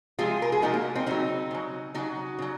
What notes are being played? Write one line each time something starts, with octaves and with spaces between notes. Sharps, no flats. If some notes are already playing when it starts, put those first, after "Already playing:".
C3 F3 G#3 F4 G#4
A#4
G#4
C3 F3 G#3 D#4 F#4
A#3
C4 D#4
C#3 F#3 C4 D#4
C#3 F#3
C#3 F#3 D#4 F#4
C#3 F#3